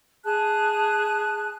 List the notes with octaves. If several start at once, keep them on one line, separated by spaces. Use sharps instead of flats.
G#4 A5 F#6